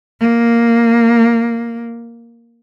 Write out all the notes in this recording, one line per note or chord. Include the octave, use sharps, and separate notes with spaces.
A#3